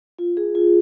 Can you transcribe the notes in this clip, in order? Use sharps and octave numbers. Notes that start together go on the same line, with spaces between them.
F4
G#4
F4